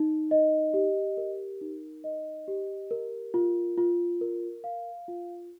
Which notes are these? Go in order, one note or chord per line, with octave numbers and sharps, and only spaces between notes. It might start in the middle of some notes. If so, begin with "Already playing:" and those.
Already playing: D#4
D#5
G4
A#4
D#4
D#5
G4
A#4
F4
F4
A#4
F5
F4